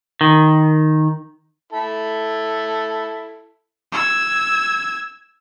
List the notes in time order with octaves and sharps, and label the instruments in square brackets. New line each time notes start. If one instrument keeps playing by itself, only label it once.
[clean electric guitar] D#3
[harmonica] E4 A4
[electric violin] E6 G#6